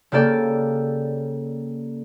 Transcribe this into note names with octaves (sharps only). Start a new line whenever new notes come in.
C#3 A#3 G4 A4 D5 G5